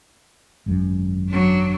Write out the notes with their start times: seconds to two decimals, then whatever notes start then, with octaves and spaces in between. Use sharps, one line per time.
0.66 G#1 F#2
1.29 F#3 D4